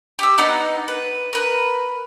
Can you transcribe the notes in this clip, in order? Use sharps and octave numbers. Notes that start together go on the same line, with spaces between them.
G4 E6
B3 D#4 F#5
B4
A#4 B4